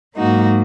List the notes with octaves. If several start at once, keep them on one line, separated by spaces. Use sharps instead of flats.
G#2 F#3 A#3 D#4 F#4